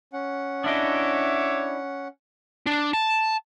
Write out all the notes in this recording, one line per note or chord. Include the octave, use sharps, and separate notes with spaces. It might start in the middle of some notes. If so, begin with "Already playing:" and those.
C#4 F#5
D4 E4 C#5 D#5 E5 D6
D4
A5